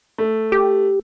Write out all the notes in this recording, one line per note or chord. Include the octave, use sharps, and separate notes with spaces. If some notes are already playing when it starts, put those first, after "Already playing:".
A3
G4